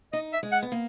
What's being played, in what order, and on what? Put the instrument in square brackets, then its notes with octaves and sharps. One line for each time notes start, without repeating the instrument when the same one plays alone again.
[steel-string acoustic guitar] D#4 [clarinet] D#5
[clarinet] E5
[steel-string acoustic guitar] G#3
[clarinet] F#5
[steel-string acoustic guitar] B3
A#3